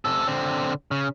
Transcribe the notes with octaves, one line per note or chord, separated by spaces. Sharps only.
C3 A4
D3 C4
C#3